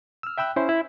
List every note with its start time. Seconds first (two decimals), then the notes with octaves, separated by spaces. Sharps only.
0.23 E6 F6
0.38 E5 G5 B5 E6 F#6
0.56 C#4 E4 C5
0.69 E4